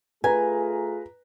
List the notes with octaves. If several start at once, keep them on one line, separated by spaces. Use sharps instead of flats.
A3 F4 G#4 B4 G#5 A#5